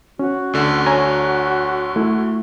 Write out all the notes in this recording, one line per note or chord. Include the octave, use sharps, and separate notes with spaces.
C#4 F#4
D2 D3
C#5 G#5 A#5
A3 E4